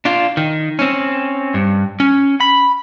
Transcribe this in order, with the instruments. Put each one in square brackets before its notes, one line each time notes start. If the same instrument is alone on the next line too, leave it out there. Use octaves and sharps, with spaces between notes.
[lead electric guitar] D4 F4
D#3
C4 C#4
G2
C#4
B5